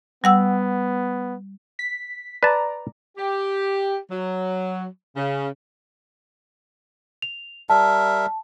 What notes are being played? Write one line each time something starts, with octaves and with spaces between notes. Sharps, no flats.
G3 B3 F#5 E6
B6
B4 D5 A5 A#5
G4
F#3
C#3
F7
G3 A#4 E5 A5